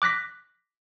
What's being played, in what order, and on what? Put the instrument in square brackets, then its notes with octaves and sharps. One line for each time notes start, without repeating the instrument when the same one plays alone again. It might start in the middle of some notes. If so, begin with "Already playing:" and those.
[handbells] D6 F#6 A#6 B6